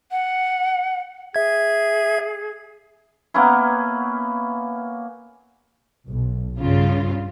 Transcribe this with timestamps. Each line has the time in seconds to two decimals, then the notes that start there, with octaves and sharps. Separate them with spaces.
0.11 F#5
1.35 G#4 E5 G#6
3.34 A#3 B3 C#4 E4
6.07 B1
6.60 G2 C#3 F4